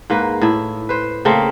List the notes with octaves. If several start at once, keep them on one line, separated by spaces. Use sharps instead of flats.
G#2 A#3 B4
A2 E4
B4 C5
C#3 A3 A#3 C4